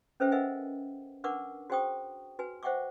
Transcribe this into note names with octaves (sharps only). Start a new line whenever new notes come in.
C#4 A4 B4 C5 E5 G5
A#4 B4 D#5 E5 F#5 G#5
D4 A#4 B4 F#5 C#6 D6
F#4 G#4 C5 G5 C#6 D#6
F#4 B4 G#5
C5 E5 F#5 G5 C#6 D6